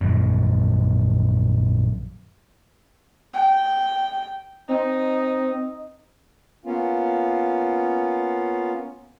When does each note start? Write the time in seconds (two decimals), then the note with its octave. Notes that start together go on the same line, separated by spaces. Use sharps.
0.01 A#1 F#2
3.34 G5
4.69 C4 D#4
6.65 A#3 B3 C#4 F4